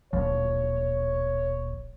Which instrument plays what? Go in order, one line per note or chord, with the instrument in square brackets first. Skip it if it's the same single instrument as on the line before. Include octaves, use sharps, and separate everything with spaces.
[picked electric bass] D1 A#1 F3 [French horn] C#5